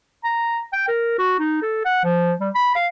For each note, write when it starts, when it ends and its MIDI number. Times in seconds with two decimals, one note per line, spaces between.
0.24 0.62 82
0.73 0.86 79
0.88 1.16 70
1.18 1.36 66
1.39 1.58 63
1.62 1.83 69
1.85 2.02 78
2.04 2.32 53
2.40 2.49 55
2.55 2.72 83
2.75 2.86 77